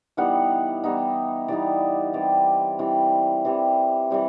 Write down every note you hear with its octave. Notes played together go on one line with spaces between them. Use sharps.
E3 G3 B3 D#4 F#5
E3 G3 B3 D#4
E3 G3 B3 D#4 D5
E3 G3 C4 D5
E3 G3 C4
E3 G3 C4
E3 G3 C4